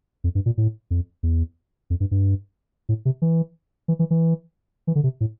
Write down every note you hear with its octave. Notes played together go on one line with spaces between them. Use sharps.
F2
G2
A#2
A2
F2
E2
F2
G2
G2
A2
C3
E3
E3
E3
E3
E3
D3
C3
A2